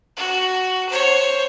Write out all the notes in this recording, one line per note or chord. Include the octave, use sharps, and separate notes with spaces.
F#4
C5 C#5